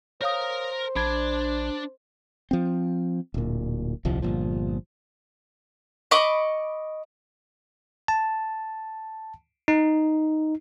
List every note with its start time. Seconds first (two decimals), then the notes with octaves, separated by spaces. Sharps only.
0.21 A#4 C5 C#5 F5 A#5 D#6
0.96 A#1 D4 B5 G#6
2.51 F3 C4
3.34 D1 A#2
4.05 D#1 C2 F3
4.22 G1 A#2 F3
6.11 D#5 B5 C#6 D6
8.08 A5
9.68 D#4